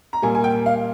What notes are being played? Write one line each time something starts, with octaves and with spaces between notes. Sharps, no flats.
A#5
A#2 G3 A#3 G#5
G#5
G5
F5